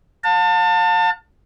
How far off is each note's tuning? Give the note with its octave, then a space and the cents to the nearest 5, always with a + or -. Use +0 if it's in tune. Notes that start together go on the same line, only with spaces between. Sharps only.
F5 +45 A5 +30